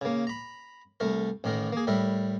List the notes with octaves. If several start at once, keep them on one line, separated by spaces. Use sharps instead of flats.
C#3 A#3
A#5 B5
C2 A3 A#4
A1 A2 D#3 A#4
A#3 G#4
A2 G3 A#4 E5